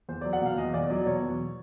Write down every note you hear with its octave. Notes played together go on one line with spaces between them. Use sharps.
E2 C5
F#3 D5
F#5
B2 F5
E2 D#5
E2 D5
F#3 D5
B2 C#5
E2